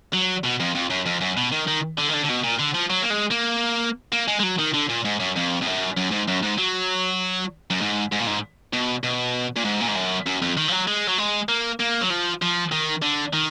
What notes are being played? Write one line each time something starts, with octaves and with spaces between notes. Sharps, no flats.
F#3
B2
F2
F2
F#2
F2
F#2
B2
D#3
D#3
D3
D#3
D3
D3
B2
A#2
D3
F3
F#3
A#3
G#3
A#3
A#3
G#3
G#3
F#3
D#3
D3
A#2
G#2
F#2
F2
F2
F#2
F#2
G#2
F#2
G#2
F#3
F#2
G#2
G#2
A#2
G#2
B2
B2
A#2
G#2
A#2
G#2
F#2
F#2
F2
D#3
F3
F#3
G#3
F#3
G#3
A#3
A#3
F#3
F3
F3
D#3
D3
D#3